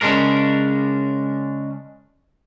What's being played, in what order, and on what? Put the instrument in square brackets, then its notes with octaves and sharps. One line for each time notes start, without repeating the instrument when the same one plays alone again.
[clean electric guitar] C#3 G#3 D4 A#4